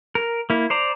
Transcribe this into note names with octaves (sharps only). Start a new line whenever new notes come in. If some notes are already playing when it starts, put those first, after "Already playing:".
A#4
A#3 E4
C5 D5 A#5